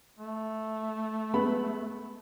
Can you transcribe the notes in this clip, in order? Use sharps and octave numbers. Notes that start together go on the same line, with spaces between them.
A3
G#3 B3 B5